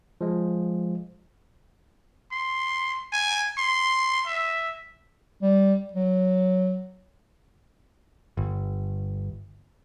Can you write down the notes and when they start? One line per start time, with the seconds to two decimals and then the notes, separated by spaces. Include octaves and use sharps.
0.21 F3 G#3
2.32 C6
3.12 G#5
3.57 C6
4.27 E5
5.42 G3
5.93 F#3
8.37 G1